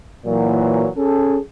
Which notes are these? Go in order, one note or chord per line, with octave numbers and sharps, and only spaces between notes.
A#2 E3 F#3
C#4 G#4 A4